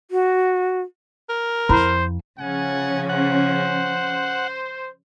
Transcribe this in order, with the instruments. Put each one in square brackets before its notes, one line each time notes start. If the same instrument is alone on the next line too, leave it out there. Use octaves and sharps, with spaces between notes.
[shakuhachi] F#4
[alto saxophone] A#4
[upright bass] F2 [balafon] E4 A#5 B5 [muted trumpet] C5
[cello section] C#3 F3 C#4 [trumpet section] F#5 G#5
[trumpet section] C5 [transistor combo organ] F#5